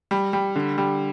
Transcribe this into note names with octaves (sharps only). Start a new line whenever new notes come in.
G3
G3
D3
G3